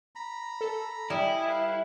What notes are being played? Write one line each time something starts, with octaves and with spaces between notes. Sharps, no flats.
A#5 B5
A4
G3 E4 D#5 G#5
B4 F5